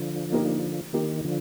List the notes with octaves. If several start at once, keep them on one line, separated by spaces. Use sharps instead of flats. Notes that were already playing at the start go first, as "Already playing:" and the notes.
Already playing: D3 F3
A#3 D#4 G4 A#4
D#3 A#3 D#4 G4 A#4
D3 F3